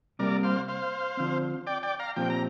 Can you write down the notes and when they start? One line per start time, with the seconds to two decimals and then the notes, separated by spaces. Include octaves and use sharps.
0.19 C3 G3 A#3 G4 A#4 D5
0.43 C5 F5
0.68 C5 F5
1.17 D3 F3 C4
1.67 D5 G5
1.83 D5 G5
2.00 F5 A#5
2.16 A#2 F3 C4 G4 G5
2.30 A#5